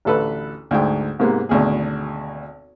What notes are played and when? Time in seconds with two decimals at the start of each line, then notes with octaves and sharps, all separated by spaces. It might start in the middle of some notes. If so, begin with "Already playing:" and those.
0.05 A1 D2 A4 B4
0.71 D2 G#2 G5
1.19 G#2 C3 A#3 B3
1.49 G#1 D2 B2 G#4